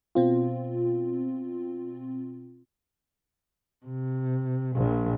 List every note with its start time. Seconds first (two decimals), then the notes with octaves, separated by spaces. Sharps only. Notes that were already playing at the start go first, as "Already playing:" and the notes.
0.15 B2 C4 F4
3.86 C3
4.76 A#1 A#2